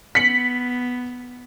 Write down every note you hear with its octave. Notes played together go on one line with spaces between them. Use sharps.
B3 B6 C#7 F#7